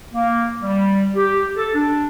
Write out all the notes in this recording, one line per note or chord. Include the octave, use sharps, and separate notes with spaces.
A#3
G3
G4
A4
D4